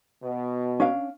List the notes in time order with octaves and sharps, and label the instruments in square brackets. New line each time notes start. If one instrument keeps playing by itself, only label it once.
[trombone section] B2
[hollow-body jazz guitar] C#4 D4 F5